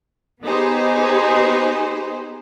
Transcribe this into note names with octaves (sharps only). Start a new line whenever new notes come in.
B3 D#4 G4 G#4 B4 C5